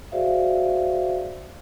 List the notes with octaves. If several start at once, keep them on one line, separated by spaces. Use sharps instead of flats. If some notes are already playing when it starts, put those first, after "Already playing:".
F#4 G#4 C5 D5 E5 F5